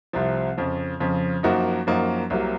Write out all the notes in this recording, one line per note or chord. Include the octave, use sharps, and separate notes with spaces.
C2 C3 F3
F2 C#3 F3
F2 C#3 F3
F#2 F3 A#3 D#4 F#4
F#2 F3 A#3 D#4 F#4
C2 C3 F#3 A#3